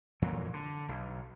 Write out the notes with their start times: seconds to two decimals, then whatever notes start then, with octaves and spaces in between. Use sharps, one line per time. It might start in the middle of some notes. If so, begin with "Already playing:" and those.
0.22 F2 A#2 E3 F#3
0.53 D3
0.89 B1